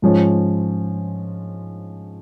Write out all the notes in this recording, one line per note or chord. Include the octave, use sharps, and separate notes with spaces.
G#2 F3 G#3 C#4